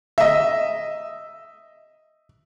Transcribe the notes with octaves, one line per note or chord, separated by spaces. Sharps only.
D#5 E5